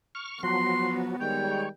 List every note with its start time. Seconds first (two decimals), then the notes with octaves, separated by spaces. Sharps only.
0.15 C#6 F6
0.43 F3 F#3 B3 F#4 C6
1.20 D#3 G3 G#3 C#5 G5